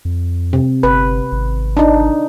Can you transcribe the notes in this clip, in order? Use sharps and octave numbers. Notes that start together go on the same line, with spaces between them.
F2
C3
G1 B4
G#1
D4 D#4